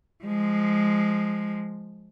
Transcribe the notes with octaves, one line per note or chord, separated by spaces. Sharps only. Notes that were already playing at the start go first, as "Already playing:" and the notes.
F3 G#3